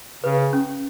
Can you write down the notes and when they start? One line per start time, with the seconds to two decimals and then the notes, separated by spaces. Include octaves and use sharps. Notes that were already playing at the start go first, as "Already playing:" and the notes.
0.23 C#3 B4
0.53 C#4